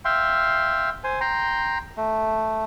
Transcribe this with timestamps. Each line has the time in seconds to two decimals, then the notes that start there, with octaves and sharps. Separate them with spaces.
0.05 E5 F5 G5 C6
1.04 C5 G#5
1.21 G5 A#5 C6
1.97 A3